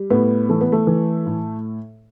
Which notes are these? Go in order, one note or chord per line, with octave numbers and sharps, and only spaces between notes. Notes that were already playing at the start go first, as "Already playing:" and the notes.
Already playing: G3
A2 B3
E3 A3
B3
A3
E3
A2